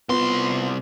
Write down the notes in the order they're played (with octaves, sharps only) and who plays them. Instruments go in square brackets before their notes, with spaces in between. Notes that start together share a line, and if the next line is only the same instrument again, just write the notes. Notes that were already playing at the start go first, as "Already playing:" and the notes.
[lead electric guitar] C2 C6 [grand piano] B3 F4